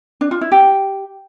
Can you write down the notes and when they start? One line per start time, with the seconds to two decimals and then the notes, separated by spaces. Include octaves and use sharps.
0.21 D4
0.31 F4
0.41 E4
0.52 G4